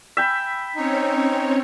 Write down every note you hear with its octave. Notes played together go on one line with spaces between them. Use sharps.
E5 G5 B5
C4 C#4 D#4 C#5